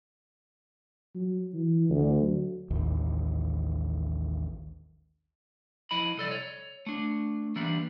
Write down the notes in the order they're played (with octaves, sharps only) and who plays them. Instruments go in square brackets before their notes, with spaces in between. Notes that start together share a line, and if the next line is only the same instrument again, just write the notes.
[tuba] F#3
E3
D2
F#3
[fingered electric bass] A1 D#2
[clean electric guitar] F3 E4 D#5 B5
C2 A4 D5 D#5
C#5
A3 D4
E3 G3 A#3 B3 D4